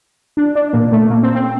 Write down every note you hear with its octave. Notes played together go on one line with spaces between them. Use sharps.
D4
D4
A#2 A#3
A3
A#3
C4
C4